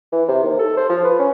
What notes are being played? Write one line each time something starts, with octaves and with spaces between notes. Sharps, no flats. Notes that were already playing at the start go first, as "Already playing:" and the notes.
E3
C3
D#2
A4
C5
F3
B4
C#4